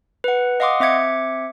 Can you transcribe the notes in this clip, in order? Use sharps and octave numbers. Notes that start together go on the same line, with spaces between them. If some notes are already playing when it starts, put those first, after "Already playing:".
B4 F#5
D#5 F5 F#5 C6 D6 D#6
C4 E5 D6 G#6 C#7